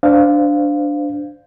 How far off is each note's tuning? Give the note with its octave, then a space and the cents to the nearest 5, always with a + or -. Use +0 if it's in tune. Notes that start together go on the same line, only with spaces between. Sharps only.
D4 +0 C5 -25 F5 +0